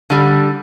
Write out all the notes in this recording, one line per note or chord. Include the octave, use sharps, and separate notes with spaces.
D3 G3